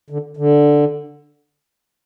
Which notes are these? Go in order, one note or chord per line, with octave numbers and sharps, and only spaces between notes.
D3
D3